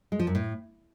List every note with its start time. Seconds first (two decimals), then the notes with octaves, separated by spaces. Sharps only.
0.12 G#3
0.19 F3
0.27 F#2
0.35 A2